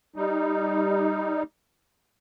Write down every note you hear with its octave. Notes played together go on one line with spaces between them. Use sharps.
G3 D#4